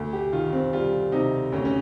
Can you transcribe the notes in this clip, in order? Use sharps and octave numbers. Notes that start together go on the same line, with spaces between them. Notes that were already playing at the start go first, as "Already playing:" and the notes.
Already playing: D2
G4
D#3 F4
C4
G3 F4
C3 D#4
D2 C#4
C#4